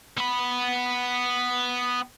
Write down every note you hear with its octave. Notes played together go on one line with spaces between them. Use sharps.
B3 B5